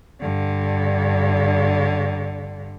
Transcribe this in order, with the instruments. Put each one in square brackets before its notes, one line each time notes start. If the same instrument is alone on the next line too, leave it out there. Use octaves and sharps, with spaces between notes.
[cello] G2 D3